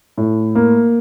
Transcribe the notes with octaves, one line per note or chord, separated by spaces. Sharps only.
A2
A#3